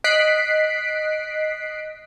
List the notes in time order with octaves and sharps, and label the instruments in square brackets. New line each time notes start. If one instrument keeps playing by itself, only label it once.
[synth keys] D#5 F#6 B6 C7 D7